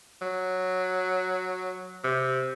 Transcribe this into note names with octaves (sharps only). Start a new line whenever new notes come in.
F#3
C3